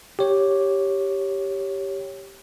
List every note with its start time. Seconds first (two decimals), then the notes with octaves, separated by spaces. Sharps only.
0.19 G4 C#5